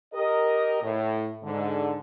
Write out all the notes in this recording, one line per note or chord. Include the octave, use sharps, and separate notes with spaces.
G4 A#4 D#5
A2
G#2 D3